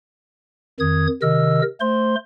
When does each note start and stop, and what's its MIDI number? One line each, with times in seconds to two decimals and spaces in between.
0.80 1.07 41
0.80 1.07 51
0.80 1.07 87
0.80 1.07 92
1.22 1.62 48
1.22 1.62 51
1.22 1.62 70
1.22 1.62 75
1.22 1.62 88
1.80 2.15 57
1.80 2.15 72
1.80 2.15 84